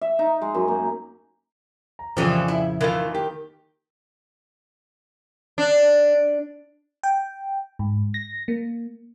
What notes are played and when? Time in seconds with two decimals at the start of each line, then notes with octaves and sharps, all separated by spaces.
0.01 E5
0.19 D#4
0.41 G#3
0.55 F#2
0.68 A#3
1.99 A#5
2.17 F2 A#2 C#3 E3 F3 G3 G#4 A4
2.48 E4
2.81 D#3 E3 A3 F4
3.14 A#3 G4
5.58 D4
7.03 G5
7.79 G#2
8.14 A#6
8.48 A#3